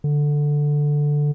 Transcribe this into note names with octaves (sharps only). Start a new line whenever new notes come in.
D3